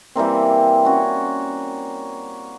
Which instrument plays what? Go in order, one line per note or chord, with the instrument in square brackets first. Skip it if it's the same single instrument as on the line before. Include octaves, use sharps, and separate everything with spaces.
[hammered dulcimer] E3 G3 A#3 C4
C#4 F#4